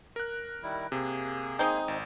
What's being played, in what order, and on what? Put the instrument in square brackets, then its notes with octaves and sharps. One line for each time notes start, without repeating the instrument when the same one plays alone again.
[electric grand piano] A#4 F#6
[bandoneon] D#3 G3 E4
[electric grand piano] C3 [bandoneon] A#3 G#4
[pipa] G#3 C4 D#4 [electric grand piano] D#6 G6
[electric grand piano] G#1